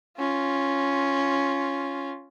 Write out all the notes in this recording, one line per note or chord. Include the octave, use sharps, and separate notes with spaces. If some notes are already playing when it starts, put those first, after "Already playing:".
C#4 F4